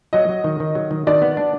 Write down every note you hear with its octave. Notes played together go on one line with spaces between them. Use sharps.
F#3 D#5
F#3
D#3
D#3
F#3
D#3
D#3 D5
B3
D4